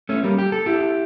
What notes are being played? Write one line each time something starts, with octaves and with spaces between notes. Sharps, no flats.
A3 C#4
G3 A#3
G4
A4
E4 G4